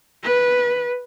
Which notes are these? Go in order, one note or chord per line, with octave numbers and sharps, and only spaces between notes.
B4